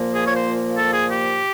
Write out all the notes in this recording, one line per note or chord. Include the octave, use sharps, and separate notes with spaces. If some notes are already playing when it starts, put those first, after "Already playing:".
Already playing: A#2 F3 A#3
G#4
C#5
C5
A4
G#4
G4